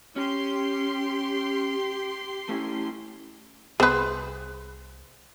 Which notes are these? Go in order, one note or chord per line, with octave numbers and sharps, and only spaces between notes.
C#4 G4 C6
A3 C#4 E4
C2 B3 G#4 B4 C5